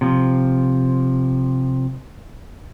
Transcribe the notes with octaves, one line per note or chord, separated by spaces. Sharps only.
C3 F3